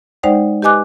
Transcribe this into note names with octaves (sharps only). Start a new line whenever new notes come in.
G#3 D#4 C5 D5 F#5 G5
G4 B4 D#5 G#5 D6 F#6